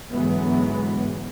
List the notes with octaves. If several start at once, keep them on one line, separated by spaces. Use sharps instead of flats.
G#2 D3 E3 F#3 G#3 B3